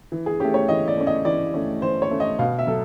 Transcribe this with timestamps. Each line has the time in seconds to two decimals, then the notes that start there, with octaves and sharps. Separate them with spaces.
0.12 E3
0.26 G#4
0.40 A3 C#4 G4
0.54 C#5
0.69 E3 D#5
0.88 D5
0.97 A3 C#4
1.07 D#5
1.25 E3 D5
1.54 A3 C#4
1.82 E3 C5
2.02 C#5
2.11 A3 C#4
2.20 D#5
2.39 B2 F5
2.59 E5
2.67 F#3 A4